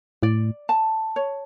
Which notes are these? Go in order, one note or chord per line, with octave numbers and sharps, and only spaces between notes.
A2 D5
A5
C#5